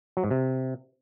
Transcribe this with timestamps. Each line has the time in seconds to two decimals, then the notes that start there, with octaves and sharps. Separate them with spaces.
0.17 F#3
0.24 G#2
0.31 C3